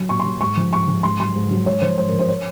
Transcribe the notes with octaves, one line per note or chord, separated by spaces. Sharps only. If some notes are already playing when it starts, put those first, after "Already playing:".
Already playing: F#3
A#2 C#6
C6
F#3
G#2 C#6
F3
G#2 C#6
F3
G#2 C6
F#3 C6
G#2
F#3
G#2 C#5
F3 C5
G#2 C5
A#4
F3
C5
C#5